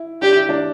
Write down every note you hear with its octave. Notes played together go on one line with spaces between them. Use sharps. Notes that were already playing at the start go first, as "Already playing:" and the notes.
Already playing: E4
D4 G4
E4
D4